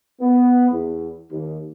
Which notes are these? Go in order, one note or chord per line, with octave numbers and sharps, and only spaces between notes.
B3
E2
D#2